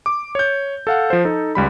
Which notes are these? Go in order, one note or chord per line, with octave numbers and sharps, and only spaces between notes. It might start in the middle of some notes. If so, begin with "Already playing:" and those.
D6
C#5 G6
A4 F5 F#5
F3 C5
D#4 A4
C#2 G3 B5